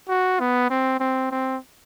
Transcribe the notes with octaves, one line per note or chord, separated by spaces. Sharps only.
F#4
B3
C4
C4
C4